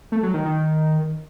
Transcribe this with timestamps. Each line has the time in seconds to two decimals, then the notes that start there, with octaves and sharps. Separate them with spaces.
0.12 A3
0.23 F#3
0.34 D#3
0.45 D#3